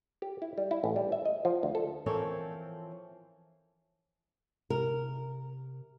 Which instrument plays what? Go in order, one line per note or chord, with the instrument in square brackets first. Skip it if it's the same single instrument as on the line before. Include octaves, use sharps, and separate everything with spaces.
[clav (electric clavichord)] G4
E4
G3
E4
A1
G3
E5
D#5
F3
D2
A4
[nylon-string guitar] E3 F3 C4 A4 A#4 C#5
[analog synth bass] C3 [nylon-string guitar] A#4